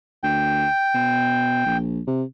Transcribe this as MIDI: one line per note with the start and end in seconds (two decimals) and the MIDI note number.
0.23 0.66 38
0.23 1.77 79
0.94 1.65 47
1.66 2.00 34
2.07 2.23 48